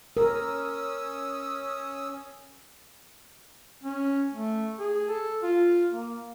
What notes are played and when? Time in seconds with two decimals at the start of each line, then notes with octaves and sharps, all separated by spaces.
0.17 C#4 A#4 D#6 E6
3.84 C#4
4.34 A3
4.79 G#4
5.09 A4
5.43 F4
5.93 A#3